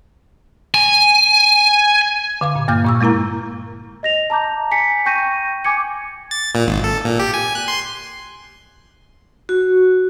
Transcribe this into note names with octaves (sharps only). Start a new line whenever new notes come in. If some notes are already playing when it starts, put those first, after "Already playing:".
G#5
D3 F5 D6
A#2
G2 A#3 F5 F6 G6 G#6
A#2 C#6 E6
G#3 A#3 E4 A#4 A#5
D#5 A#6 F7
A5 A#5 D6 G6
G#5 B6 C#7
G5 C#6 G6 A#6 D#7
G#5 D6 G#6 C#7
A6
A#2
G#1
A4
A#2
G4
G#5
F#6
C6
F#4